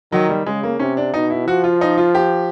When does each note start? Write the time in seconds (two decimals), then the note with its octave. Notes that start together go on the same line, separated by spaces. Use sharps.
0.12 D#3 F#3
0.29 G3
0.46 C#3 G#3
0.63 A#3
0.79 C3 C#4
0.97 D4
1.14 B2 D#4
1.30 E4
1.47 F3 F#4
1.64 F4
1.81 D#4
1.98 F4
2.15 G4